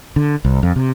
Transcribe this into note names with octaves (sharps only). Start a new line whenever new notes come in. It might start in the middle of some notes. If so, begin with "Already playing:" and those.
D3
C2
F2
C3